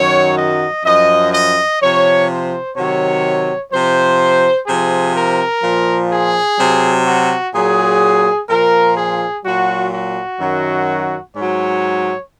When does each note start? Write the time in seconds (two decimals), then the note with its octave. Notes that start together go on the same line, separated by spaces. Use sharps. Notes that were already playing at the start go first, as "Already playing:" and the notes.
Already playing: F#2 D#3 F#3 C#5
0.38 D#5
0.85 F#2 F3 D#5
1.33 D#5
1.80 C3 F3 C#5
2.29 C5
2.76 C3 D#3 F#3 C#5
3.72 C3 F3 C5
4.67 C3 F3 G#4
5.15 A#4
5.63 A#2 F3
6.11 G#4
6.58 C3 F#3
7.06 F#4
7.54 A#2 F#3 G#4
8.49 A#2 F3 A#4
8.96 G#4
9.44 A#2 F#3 F#4
9.93 F#4
10.40 F#2 D#3 F#3
11.35 G#2 F#3 C#5